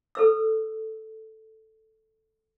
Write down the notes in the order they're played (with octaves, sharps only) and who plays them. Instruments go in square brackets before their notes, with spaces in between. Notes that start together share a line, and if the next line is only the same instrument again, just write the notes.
[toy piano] A4 B4 E6